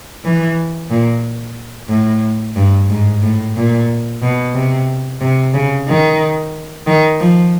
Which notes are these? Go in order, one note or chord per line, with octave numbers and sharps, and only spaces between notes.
E3
A#2
A2
G2
G#2
A2
A#2
B2
C3
C3
C#3
D#3
D#3
F3